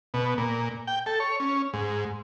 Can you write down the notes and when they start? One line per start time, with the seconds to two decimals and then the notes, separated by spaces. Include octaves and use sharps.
0.14 B2
0.38 A#2
0.87 G5
1.06 A4
1.20 C#5
1.40 C#4
1.73 G#2